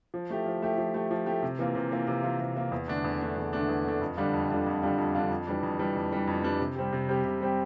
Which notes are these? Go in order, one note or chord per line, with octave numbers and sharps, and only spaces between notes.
F3
A3 E4 G4
F3
A3 E4 G4
F3
A3 E4 G4
F3
A3 E4 G4
C3
E3 A#3 F4
C3
E3 A#3 F4
C3
E3 A#3 F4
C3
E3 A#3 F4
E2
D3 A3 D4
E2
D3 A3 D4
E2
D3 A3 D4
E2
D3 A3 D4
F2
D3 G3 D4 F4
F2
D3 G3 D4 F4
F2
D3 G3 D4 F4
F2
D3 G3 D4 F4
F2
E3 G3 D4
F2
E3 G3 D4
F2
E3 G3 D4
F2
E3 G3 D4
C3
G3 C4 G4
C3
G3 C4 G4
C3
G3 C4 G4